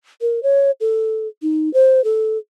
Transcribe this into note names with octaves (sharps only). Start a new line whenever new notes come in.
A#4
C#5
A4
D#4
C5
A4